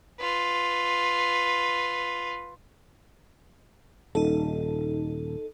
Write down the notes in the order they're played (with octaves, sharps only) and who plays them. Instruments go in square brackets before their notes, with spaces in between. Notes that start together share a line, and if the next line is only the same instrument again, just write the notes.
[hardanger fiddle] F4 B4
[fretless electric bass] D#1 [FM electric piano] D#4 A4